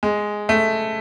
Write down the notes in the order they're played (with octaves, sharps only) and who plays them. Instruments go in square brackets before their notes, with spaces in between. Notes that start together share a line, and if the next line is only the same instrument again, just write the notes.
[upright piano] G#3
A3